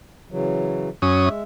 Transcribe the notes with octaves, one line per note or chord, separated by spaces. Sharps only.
C#3 E3 F#3
F#2 C#4 D#6
G#3 E5